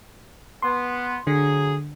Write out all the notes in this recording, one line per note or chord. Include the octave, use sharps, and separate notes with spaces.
B3 C6
D3 F#3 G#4